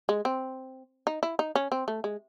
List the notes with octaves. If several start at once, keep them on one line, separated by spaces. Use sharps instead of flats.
G#3
C4
D#4
E4
D#4
C#4
C4
A3
G#3